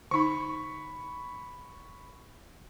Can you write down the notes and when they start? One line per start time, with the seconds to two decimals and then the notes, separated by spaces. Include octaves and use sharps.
0.11 D3 D#4 B5 C#6